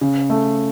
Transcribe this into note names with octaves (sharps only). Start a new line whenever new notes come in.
C#3
A3